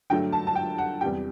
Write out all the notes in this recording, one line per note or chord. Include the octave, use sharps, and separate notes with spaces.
G2 D3 F#3 A3 G5
A5
A5
G5
F#5
E2 C3 G3 G5